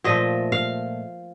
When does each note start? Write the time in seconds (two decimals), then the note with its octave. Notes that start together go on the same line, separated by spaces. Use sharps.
0.04 A#2 F3 A3 D#5
0.52 F5